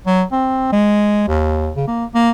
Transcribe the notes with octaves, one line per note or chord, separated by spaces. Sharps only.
F#3
C4
G#3
D#2
C#3
A#3
A#3